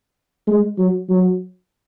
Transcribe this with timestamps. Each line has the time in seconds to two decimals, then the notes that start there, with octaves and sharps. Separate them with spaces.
0.47 G#3
0.78 F#3
1.09 F#3